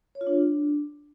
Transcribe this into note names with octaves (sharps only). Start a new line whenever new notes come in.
C#5
F4
D4